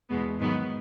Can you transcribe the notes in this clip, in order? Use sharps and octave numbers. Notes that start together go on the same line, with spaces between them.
E2 B2 G#3 B3
G#2 D#3 F#3 B3